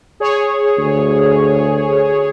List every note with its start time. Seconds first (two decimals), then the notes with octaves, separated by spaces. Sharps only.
0.20 G#4 C#5
0.78 D2